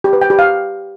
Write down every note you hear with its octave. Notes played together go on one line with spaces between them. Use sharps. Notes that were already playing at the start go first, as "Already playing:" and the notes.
G4
B4
G5
G4
F5